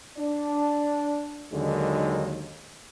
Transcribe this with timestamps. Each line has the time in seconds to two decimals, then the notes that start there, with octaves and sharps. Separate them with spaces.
0.17 D4
1.52 D#2 D3 D#3 F#3 G#3